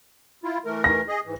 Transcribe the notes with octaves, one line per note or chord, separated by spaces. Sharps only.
E4 F4
E3 A3 A#4
A#6
G#4 D#5
G#2 E3